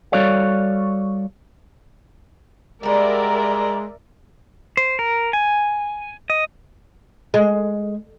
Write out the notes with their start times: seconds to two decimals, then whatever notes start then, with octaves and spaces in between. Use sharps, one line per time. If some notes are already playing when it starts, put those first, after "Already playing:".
0.12 G3 F#4 A4 C#5 D5 F5
2.83 G3 G#3 A#4 D5 E5 F#5 A#5
4.77 C5
4.99 A#4
5.33 G#5
6.30 D#5
7.34 G#3